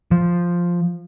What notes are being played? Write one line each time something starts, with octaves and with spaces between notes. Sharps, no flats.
F3